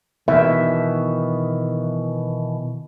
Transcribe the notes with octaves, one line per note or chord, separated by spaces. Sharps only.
B2 D#3 E3 E5